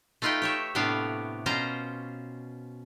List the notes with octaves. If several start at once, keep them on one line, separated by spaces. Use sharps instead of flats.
A3 D#4 F4 B4 D#5 G5
G4 C#5 E5
A2 C3 B3 D4 C#5 F5
B2 C#4 F4 C5 A#5